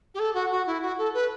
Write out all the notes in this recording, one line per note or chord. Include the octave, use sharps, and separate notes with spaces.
G4
A4
F#4
F#4
E4
F#4
A4
B4